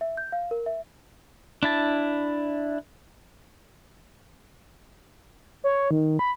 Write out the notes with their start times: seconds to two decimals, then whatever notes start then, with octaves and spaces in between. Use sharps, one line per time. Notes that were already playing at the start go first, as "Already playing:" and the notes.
0.01 E5
0.17 G6
0.32 F5
0.51 A#4
0.66 E5
1.63 D4 E4 A5
5.64 C#5
5.91 D#3
6.19 B5